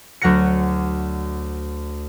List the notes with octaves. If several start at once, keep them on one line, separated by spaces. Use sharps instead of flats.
D2 F#3 F#5 A#6 C#7